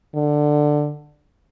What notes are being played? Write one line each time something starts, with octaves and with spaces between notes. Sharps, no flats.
D3